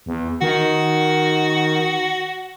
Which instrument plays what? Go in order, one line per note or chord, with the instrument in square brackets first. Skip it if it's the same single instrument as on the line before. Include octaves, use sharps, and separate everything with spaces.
[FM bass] E2
[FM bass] D#3 [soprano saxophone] F#4